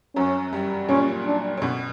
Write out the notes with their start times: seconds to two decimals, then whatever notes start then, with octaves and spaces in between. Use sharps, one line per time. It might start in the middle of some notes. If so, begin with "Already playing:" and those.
0.16 F#2 F#3 C#4
0.53 G2 G3
0.89 A#2 A#3 C#4
1.26 D4
1.57 C#4
1.62 B2 B3